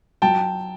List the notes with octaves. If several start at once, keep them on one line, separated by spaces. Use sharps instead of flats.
F#3 G5 A5